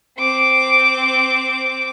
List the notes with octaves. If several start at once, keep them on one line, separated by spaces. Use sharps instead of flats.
C4 D6